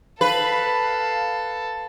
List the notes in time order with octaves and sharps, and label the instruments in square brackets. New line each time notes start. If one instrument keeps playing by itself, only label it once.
[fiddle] A4 [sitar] B4 [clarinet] F5